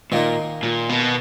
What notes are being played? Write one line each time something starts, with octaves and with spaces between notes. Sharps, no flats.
A#2 D#3 A#3 D#4
A#2
B2